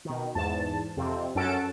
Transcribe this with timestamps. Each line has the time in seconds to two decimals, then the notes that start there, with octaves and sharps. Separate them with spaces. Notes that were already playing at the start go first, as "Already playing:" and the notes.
0.05 B2 D#3
0.35 E2 G#2 A5
0.97 F2 C3 C4
1.35 F#2 C#4 F#4 A4 A5 D7